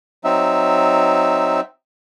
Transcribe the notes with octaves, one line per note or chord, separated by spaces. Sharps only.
F#3 C4 D#4 E5